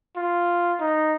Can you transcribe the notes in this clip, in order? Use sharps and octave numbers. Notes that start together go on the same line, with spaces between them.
F4
D#4